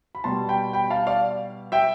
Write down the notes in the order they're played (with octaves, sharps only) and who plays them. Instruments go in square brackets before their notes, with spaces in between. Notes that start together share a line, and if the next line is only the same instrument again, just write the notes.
[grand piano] B5
B2 G3 A5 C6
G5 B5
G5 B5
F5 A5
D5 F5
E5 G5